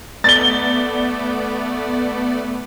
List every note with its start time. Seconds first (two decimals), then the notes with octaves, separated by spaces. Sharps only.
0.24 A3 B3 D5 A6 G7